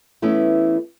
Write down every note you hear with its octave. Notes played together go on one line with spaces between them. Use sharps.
E3 A3 B3 C#4 E4